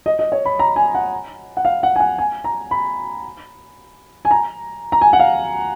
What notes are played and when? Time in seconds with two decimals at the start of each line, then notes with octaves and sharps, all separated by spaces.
0.06 D#5
0.19 D#5
0.32 C#5
0.45 B5
0.59 A#5
0.76 G#5
0.95 F#5
1.57 F#5
1.65 F5
1.83 F#5
1.96 G#5
2.00 F#5
2.18 G#5
2.44 A#5
2.71 B5
4.25 G#5
4.31 A#5
4.92 A#5
5.01 G#5
5.13 F#5
5.19 F5